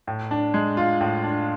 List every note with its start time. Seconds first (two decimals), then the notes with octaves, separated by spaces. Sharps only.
0.07 A2
0.31 D4
0.54 G#3
0.77 F4
1.01 A2
1.24 D4